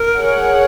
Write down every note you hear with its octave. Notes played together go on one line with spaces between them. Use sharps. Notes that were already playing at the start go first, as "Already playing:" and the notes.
Already playing: A#4
G#4 C#5 F#5